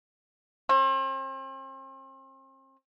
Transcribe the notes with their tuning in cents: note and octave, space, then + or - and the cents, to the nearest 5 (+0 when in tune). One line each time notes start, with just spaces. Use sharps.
C4 +40